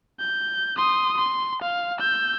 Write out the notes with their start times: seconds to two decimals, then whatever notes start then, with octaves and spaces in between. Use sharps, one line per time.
0.20 G6
0.77 C6 D#6
1.17 C6
1.62 F5
1.99 E6 G6